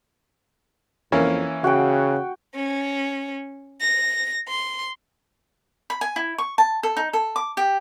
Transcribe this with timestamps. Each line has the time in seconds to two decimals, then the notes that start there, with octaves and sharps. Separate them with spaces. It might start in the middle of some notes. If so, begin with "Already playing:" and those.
1.12 F2 E3 A#3 C#4
1.64 C#3 F#4 F#5 G5
2.55 C#4
3.81 A#6
4.48 C6
5.90 B5
6.01 G#5
6.16 E4
6.38 C#6
6.58 A5
6.83 A4
6.97 D#4
7.13 A4
7.36 D6
7.57 G4